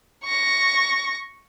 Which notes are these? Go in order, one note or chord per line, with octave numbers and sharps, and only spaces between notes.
C#6 A#6